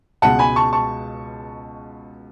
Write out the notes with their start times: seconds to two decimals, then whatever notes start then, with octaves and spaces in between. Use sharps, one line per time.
0.22 C#2 B2 G#3 F#5 A5
0.39 G#5 B5
0.56 A5 C#6
0.73 A5 C#6